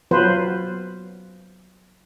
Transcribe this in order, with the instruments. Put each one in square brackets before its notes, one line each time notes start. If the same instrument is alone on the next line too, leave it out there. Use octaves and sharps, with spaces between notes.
[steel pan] F#3 B3 F4 B4 C5